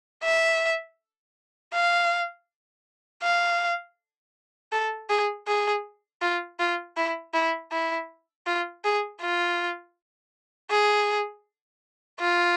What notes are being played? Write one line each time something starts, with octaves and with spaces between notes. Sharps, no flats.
E5
F5
F5
A4
G#4
G#4
F4
F4
E4
E4
E4
F4
G#4
F4
G#4
F4